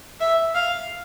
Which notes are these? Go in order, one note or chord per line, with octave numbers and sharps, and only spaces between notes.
E5
F5